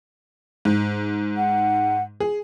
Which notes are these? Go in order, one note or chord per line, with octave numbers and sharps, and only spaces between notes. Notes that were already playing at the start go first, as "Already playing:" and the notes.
G#2
F#5
G#4